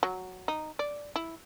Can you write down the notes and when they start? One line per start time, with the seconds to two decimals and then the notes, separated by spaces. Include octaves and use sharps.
0.03 F#3
0.48 D#4
0.79 D5
1.16 E4